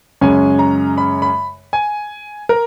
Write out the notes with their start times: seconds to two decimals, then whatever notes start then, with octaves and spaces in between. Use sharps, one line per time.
0.21 F#2 C#3 G#3 C#4 G#5
0.59 A#5
0.98 B5
1.22 B5
1.73 G#5
2.49 A#4